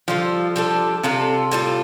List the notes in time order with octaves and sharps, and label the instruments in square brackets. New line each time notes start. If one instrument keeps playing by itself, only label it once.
[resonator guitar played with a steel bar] F3 [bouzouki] G3 F4 A4
[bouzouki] G3 D4 A4
[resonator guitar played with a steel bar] C3 [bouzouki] G3 F4 A4
[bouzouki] A2 G3 F4 A4